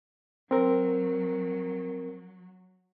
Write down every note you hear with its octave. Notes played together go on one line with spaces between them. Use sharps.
F#3 C4 A#4